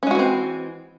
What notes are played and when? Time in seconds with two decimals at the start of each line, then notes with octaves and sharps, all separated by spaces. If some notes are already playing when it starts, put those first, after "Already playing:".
0.03 C#4
0.07 G#3
0.11 F#4
0.15 E3
0.19 C4